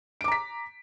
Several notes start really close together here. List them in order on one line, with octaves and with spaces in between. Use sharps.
D7 D6 A#5 B6